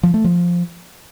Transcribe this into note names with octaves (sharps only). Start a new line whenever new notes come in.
F3
A3
F3